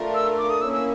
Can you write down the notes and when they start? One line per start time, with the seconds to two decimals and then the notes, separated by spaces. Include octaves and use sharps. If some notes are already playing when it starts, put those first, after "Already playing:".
Already playing: A3 D4 F4 A#4
0.15 E6
0.38 D6
0.50 D#6
0.61 A#3 C#4 E4 E6
0.73 E6